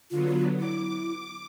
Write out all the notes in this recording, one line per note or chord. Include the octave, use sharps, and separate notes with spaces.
D3 F#3 B3 F4
E4 D6